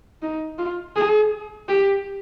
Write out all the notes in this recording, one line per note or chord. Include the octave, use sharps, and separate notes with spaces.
D#4
F4
G#4
G4